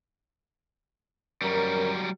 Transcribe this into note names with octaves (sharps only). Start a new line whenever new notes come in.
F#2 F#3 G3 A#4